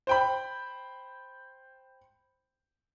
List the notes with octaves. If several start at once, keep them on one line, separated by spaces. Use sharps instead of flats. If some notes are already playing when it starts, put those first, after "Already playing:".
C5 G5 B5